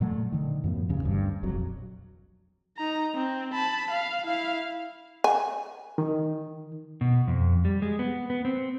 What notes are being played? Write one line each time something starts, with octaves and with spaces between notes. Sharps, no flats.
A#2 F#3 A3
D3 D#3
F#2 A2 F3 B3
D#2 C#3
G1 D2 G2
E1 A#1 F2 F#3
D#4 A#5
C4
A5 B5
F5
E4 F5
G#5
D#3
B2
F2
G3
G#3
B3
B3
C4